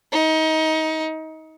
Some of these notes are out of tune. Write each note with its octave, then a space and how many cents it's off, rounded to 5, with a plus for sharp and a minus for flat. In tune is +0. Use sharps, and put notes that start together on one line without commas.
D#4 +25